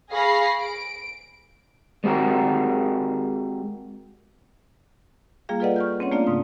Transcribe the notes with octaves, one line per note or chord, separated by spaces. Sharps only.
G#4 F5 B5 C#6 A#6 C7
D7
G#3 C4 F#4 G4 A#4
G3 A#3 F4 G#4 F5 G5
F4 A4 B4 D5 D#5 F#5
C#6 F6 G6
C4 C#4 C#5 F#5
A3 A#3 D4 F4 D5 F5
G#2 C#3 D#6